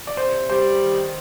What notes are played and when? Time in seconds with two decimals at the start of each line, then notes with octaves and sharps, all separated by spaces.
0.07 D5
0.17 C3 C5
0.50 G3 C5
0.82 D#3